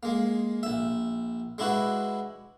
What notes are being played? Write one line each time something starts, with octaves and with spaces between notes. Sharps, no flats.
G#3 A#3
A#1 E5
G#3 D4 E4 F#4 B4